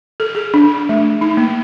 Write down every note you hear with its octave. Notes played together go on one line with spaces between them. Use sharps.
A4
G#4
D4
A3
D#4
A#3